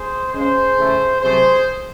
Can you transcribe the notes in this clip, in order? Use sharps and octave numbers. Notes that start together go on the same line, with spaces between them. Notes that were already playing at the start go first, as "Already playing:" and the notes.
Already playing: G#4 C5
C#3 G#3 G#4 C5
C#3 E3 A3
C3 F#3 A3 G#4 C5